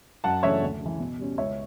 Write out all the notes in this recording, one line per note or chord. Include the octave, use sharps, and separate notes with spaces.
F#2 F#5 A5
C#3 E3 A3 D4 C#5 E5
D2
C#3 E3
B2
G3 C#4
C#2 C#5 E5